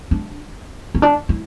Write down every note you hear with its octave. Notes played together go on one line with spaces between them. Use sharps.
D4
C#4
D4
E4